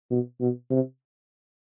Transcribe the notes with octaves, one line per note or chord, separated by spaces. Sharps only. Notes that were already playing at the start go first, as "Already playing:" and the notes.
B2
B2
C3